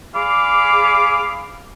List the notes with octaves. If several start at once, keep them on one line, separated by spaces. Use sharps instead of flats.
G#4 D5 F5 B5 D6